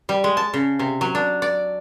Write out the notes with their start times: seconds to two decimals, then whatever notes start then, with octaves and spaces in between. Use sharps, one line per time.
0.09 G3
0.24 G#3
0.37 A5
0.54 C#3
0.79 C3
1.01 F#3
1.15 D4
1.42 D5